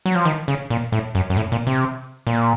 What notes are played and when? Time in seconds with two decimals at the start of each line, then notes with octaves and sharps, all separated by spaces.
0.06 F#3
0.15 F3
0.25 D#3
0.48 C#3
0.70 A#2
0.92 A2
1.15 F#2
1.30 F#2
1.37 A2
1.52 A#2
1.67 C3
2.27 A#2